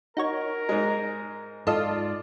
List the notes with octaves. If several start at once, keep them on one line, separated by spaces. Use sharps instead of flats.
D#4 F#4 A#4 C#5
G#2 G#3
G#2 F4 A4 D5 D#5